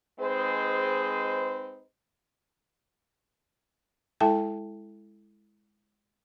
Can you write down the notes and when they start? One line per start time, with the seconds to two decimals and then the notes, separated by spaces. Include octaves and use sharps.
0.19 G#3 C4 D#4 G#4 B4 C5
4.20 G#3 E4 A4 E5 G5 A5